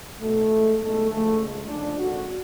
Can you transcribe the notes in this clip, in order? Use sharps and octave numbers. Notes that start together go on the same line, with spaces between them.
B1 B2 F#3 A3
A1 A2 G#3
B1 A2 G#3 A3
D2 D3 F3 G#3 A3
C#2 C#3 G#3
D2 C#3 F3 G#3 D4
G#1 F#2 D3 F#4